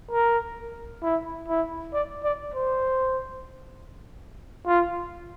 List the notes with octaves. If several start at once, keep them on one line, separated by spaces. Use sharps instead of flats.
A#4
E4
E4
D5
D5
C5
F4